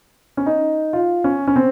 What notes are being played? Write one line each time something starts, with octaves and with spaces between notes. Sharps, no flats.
C#4
D#4
F4
C#4
C#4
C4